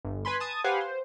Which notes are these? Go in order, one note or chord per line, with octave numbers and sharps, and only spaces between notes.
G1
B4 G#5 B5 C6
A5 D#6 G#6
G4 B4 C5 F5 F#5 G#5
C5